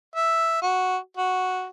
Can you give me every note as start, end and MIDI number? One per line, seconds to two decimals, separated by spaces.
0.16 0.60 76
0.62 0.98 66
1.17 1.67 66